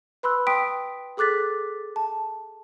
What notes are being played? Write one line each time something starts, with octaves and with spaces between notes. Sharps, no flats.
B4 B5 C6 E6 F#6
G5 C6 D#6 B6 D7
G#4 A4 D6 F#6 A6 B6
A5